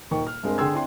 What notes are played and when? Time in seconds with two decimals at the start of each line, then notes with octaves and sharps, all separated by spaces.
0.11 D#1 D#3 G5 C#6
0.27 F6
0.43 G2 G#3 C4 A#4
0.58 D3 G#4 G5 C6 E6 G#6
0.73 C4 D4 E4 G5 C6